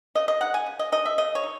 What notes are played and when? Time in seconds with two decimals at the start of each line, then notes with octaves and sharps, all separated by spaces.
0.15 C#3 D#5
0.28 D#5
0.41 G#3 D#4 F#5
0.54 G#5
0.66 C#3
0.79 D#5
0.92 G#3 D#4 D#5
1.05 E5
1.18 C#3 D#5
1.35 C#5
1.43 D#4